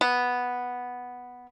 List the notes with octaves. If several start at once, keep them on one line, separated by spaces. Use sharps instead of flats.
B3